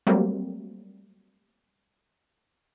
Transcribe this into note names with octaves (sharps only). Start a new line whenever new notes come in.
F#3 G3 A3 A#3 C4